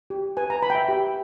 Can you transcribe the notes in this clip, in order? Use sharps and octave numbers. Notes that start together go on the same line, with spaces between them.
G4
B4 G#5
A#5
B4 B5
G5
E5
G4